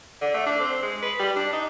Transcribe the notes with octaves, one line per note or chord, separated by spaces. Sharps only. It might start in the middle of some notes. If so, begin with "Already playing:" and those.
D3
A3
D4
C4
G#3
B4
G3
D4
D#4